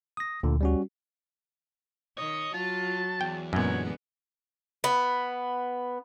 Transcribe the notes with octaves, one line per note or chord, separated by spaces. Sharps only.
D#6 A#6
D2 A#2 D3
G3 C#4 F#4
D#3 C#5 D#5
F#3 F4 A5
E2 G5
F#2 A#2 D3 G#3 B3 C#5
B3